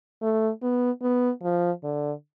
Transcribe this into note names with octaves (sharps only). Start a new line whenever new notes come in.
A3
B3
B3
F3
D3